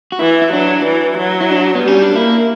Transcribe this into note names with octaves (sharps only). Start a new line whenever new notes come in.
F#4
E3 E4
E4
F#3 D4
E3
F#3
E4
D4
B3
G3 C#4
D4
A#3 E4